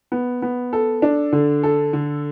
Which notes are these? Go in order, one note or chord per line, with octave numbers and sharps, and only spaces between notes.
B3
B3
A4
D4
D3
A4
D3